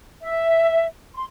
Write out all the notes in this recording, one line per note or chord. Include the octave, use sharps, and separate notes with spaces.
E5
C6